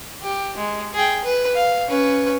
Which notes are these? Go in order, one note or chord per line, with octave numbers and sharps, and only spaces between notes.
G4
G#3
G#4 G5
B4
F5
C#4 B4